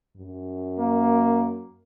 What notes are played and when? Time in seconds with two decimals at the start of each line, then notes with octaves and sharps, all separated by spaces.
0.16 F#2
0.79 A#3